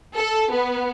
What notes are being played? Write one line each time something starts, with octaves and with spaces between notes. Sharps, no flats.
A4
B3